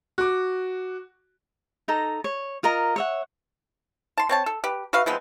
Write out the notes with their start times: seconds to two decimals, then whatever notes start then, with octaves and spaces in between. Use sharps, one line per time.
0.18 F#4 D6
1.88 D#4 A4 A#5
2.24 C#5
2.63 F4 A#4 D#5 A#5
2.96 C#5 E5 F#5
4.18 A5 C6
4.29 C4 C#5 A5
4.46 A4
4.64 G4 B4
4.93 F#4 B4 E5 F5
5.06 F3 G#3 B3 C4